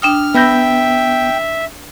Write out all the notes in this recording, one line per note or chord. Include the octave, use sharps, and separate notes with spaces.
D4 G5 D#6 F6
B3 E5 G5 B5 E6 G6 A#6